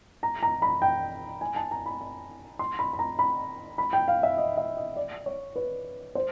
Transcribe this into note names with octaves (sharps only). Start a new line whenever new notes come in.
A#5
A#5
B5
G5
G#5
A5
A#5
B5
B5
C6
B5
B5
A#5
B5
B5
G5
F5
E5
D#5
E5
D#5
D5
C#5
B4
C5